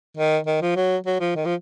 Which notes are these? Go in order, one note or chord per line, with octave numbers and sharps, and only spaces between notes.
D#3
D#3
F3
F#3
F#3
F3
D#3
F3